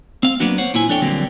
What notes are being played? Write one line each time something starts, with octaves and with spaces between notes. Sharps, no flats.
C4 F5
F#3 A#3 B3 D4 F#4
C5 C#5 F#5
A#2 A#3 E4 G#5
F2 D4 A4 C#5 G5
F2 D3 F#3 G3 A#3 C4